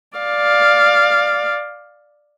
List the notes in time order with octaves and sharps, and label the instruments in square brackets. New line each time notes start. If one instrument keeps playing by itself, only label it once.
[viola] D5 F5